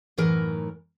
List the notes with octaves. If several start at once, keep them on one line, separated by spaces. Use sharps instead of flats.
F#2 A2 E3 D#4 A#4 B4